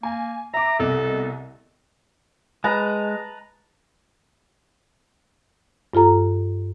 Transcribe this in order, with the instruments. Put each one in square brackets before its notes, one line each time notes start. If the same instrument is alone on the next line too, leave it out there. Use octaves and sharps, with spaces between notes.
[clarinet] A#3 [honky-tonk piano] G#5
[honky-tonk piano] E5 D6 [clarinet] A#5
[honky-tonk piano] C2 B2 D#5 [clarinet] A4
[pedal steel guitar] G#3 [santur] B4 A5 A#5
[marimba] G2 F4 A4 A#5